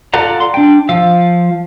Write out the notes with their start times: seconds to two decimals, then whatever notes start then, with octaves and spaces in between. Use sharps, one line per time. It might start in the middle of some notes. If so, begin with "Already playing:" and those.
0.14 F4 A4 D5 F#5 A#5
0.40 C6
0.54 D4 G5
0.89 F3 F5 E6